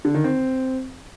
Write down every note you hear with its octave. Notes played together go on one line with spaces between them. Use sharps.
D3
D#3
C4